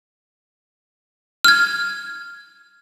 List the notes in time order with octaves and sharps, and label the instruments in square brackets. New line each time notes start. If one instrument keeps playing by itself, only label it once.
[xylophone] F6 G#6